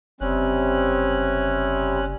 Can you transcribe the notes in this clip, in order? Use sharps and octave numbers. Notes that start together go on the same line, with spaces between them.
F#1 C3 G3 C4 C#4 F#6